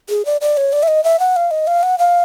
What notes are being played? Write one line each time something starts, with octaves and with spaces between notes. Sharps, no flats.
G#4
D5
D5
C#5
D5
E5
D#5
E5
F#5
F5
D#5
F5
F#5
F5